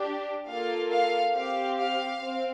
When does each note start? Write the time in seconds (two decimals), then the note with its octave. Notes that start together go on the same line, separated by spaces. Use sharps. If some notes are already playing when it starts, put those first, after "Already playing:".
Already playing: D4 G4
0.47 A#3 F4 A4 F5
0.91 F5
1.35 C4 G4 F5
1.78 F5
2.21 C4